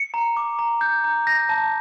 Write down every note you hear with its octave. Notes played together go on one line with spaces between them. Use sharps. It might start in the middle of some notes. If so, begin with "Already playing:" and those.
Already playing: C#7
A#5
D6
A#5
G6
A#5
G6 A#6
A5